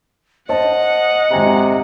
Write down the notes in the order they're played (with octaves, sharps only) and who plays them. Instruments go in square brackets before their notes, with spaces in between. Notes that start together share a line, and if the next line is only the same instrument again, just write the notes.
[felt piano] C5 A5 [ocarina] D#5 [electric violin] F#5
[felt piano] G#1 G#5 A#5 [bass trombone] C3